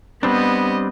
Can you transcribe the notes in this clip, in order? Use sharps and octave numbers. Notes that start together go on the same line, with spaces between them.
G3 B3 C4 D4 D#5